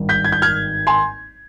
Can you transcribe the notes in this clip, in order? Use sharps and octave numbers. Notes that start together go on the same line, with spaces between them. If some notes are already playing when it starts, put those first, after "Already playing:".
Already playing: G#1 G2 D#3 G3
G6 B6
G#6
G6
F6 G#6
G#5 C6